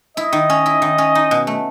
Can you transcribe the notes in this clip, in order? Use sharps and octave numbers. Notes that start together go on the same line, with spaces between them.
E4 D#5
D#3
C#4
E4
D#3
C#4
D#4
B2
A3